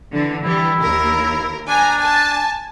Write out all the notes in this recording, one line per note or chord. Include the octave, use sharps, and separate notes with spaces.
D3 E3
E3 G3 E4
D#2 A#4
D4 G#5 A#5
G#5 A5